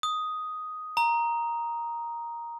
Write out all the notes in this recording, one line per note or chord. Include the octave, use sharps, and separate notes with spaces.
D#6
A#5